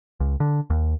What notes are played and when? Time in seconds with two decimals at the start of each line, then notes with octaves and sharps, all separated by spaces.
0.20 C#2
0.40 D3
0.70 D#2